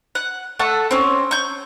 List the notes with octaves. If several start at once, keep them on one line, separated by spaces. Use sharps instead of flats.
F#5
A3 A4 F#5
C4 C#4
C#6 G6